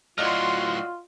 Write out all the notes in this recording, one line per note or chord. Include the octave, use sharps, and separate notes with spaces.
A2 F#3 F4 F#4 D5 D#5 C6 F6